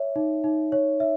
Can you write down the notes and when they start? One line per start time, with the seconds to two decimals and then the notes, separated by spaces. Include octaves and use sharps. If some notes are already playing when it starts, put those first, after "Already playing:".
Already playing: C#5 E5
0.16 D#4
0.44 D#4
0.72 C#5
1.00 E5